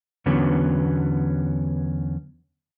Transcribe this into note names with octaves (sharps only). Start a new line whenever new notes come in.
E2 D3 F#3 B3 C#4